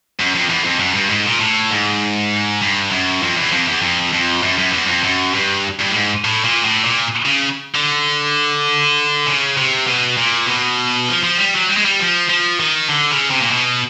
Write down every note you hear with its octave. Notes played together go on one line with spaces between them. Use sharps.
F#2
F2
E2
F2
F#2
G2
G#2
A#2
A2
G#2
G2
F#2
F2
E2
F2
E2
F2
F2
F#2
F#2
E2
F2
F#2
G2
G2
A2
G#2
A2
A#2
A2
A#2
C#3
D3
C#3
C3
B2
A#2
B2
F3
F3
G3
F#3
G3
G#3
G3
F3
F3
D#3
D3
C#3
C3
A#2
B2